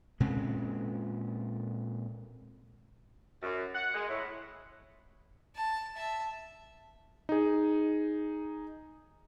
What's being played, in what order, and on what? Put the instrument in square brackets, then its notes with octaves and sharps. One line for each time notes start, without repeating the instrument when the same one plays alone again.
[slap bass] A#2 G#3 C4 C#4
[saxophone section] F#2
F#5
G#3
A2
[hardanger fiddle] A5
E5 A5
[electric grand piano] D#4 G#4